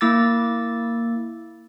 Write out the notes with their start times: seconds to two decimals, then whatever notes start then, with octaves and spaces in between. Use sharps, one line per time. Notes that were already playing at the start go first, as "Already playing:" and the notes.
0.01 A#3 E4 D6 E6 A6